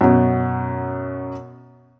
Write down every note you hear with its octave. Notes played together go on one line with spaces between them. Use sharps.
F#2 B2